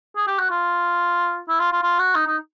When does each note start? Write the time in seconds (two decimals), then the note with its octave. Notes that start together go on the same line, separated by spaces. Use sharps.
0.16 G#4
0.27 G4
0.39 F#4
0.50 F4
1.49 E4
1.60 F4
1.72 F4
1.82 F4
1.99 F#4
2.15 D#4
2.27 D#4